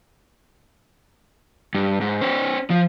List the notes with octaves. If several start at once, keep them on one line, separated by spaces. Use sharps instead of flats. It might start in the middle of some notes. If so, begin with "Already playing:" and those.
G2
G#2
C#4 C5
F3